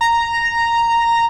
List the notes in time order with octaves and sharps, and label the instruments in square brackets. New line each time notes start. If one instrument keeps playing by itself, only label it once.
[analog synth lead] A#5